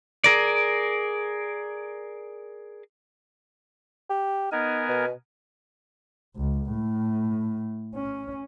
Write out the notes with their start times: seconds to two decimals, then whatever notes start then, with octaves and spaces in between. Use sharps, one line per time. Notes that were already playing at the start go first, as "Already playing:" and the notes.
0.24 G#4 A#4 D5
4.10 G4
4.52 B3 D#4 A#4 G#5
4.89 B2
6.36 C#2
6.71 A2
7.95 C#4